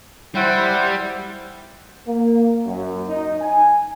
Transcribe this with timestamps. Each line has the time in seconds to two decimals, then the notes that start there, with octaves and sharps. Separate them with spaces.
0.35 G3 E4 C5 F#5
2.08 A#3
2.66 F#2
3.09 D#4
3.42 G#5